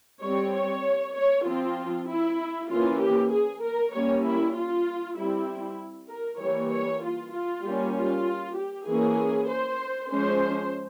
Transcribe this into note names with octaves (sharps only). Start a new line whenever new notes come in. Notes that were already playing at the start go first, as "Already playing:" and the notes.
G3 C4 C#5
C#5
C#5
F3 C4 F4
E4
E3 A#3 C#4 F4
G4
G#4
A#4
G3 A#3 C#4 C#5
E4
F4
G3 C4 E4
A#4
E3 G3 A#3 C#5
C#5
F4
F4
G3 A#3 C#4
F4
G4
E3 A#3 C#4 G#4
C5
F3 G#3 C#4 C5